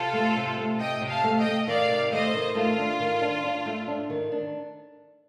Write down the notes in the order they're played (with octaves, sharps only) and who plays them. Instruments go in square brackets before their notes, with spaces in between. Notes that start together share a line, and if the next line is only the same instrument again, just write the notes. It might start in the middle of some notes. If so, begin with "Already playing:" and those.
Already playing: [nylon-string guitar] C3 [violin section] F4 A4
[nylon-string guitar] A3
C3
A3
[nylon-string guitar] C3 [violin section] D#5 G5
[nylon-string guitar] C3
[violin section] F5 A5
[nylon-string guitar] A3
[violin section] D#5 G5
[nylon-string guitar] A3
[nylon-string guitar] D#3 [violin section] D5 F5
[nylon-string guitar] C3
[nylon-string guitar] A3 [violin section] C5 D#5
[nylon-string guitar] D#3
[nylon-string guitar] A3 [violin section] F4
[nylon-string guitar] D4
D#3
D4
D4
A3
D4
D#3
D4